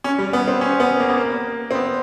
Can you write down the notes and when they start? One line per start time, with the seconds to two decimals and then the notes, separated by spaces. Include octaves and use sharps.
0.04 C#4
0.19 G3
0.33 B3
0.48 C4
0.61 C#4
0.80 B3
1.00 A#3
1.09 B3
1.18 A#3
1.71 C4
1.75 B3